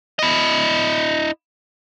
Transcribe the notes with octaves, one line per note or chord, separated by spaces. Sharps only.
E4 D#5